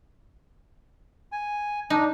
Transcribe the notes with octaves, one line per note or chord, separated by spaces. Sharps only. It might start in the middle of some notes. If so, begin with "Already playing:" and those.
G#5
D4 D#4